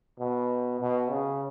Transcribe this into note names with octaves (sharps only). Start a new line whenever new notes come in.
B2
B2
C#3